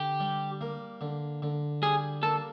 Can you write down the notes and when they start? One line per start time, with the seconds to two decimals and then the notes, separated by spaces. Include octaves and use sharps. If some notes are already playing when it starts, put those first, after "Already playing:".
Already playing: D3 G4
0.20 G3
0.61 A#3
1.01 D3
1.42 D3
1.82 G3 G#4
2.23 A#3 A4